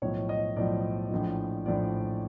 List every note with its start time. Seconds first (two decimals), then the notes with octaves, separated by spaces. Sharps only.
0.02 B1 A2 F3 C#5
0.29 D#5
0.56 B1 A2 F3 D5
1.11 A#1 A2 F3
1.66 A#1 A2 F3 D5